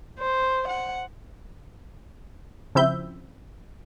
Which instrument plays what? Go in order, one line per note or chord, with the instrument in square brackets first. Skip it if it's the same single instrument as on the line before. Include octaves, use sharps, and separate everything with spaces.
[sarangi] C5
F#5
[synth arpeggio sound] C#3 F3 C4 E4 E5 G6